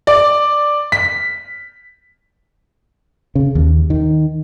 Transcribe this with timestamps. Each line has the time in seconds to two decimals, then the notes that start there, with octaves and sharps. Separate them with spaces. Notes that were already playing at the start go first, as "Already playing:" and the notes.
0.07 D5
0.92 B6
3.35 C#3
3.55 D#2
3.90 D#3